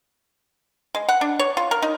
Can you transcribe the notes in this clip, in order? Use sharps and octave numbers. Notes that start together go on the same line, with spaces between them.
G#3
F#5
D4
C#5
F4
A#4
D#4